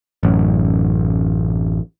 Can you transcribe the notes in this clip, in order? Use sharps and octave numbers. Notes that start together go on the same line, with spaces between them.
A1 F#2